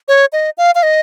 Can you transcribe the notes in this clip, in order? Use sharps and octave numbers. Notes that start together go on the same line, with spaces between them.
C#5
D#5
F5
F5
D#5